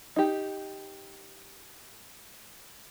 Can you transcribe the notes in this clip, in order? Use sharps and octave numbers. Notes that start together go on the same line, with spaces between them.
D#4 G4